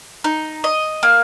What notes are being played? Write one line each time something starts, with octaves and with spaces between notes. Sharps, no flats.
D#4
D#5
A#3